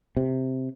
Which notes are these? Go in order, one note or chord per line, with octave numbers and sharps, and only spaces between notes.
C3